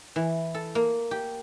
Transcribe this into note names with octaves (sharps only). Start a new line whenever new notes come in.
E3
A4
A#3
G4